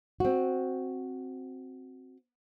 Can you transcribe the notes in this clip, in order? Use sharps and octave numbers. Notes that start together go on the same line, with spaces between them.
C4 F#4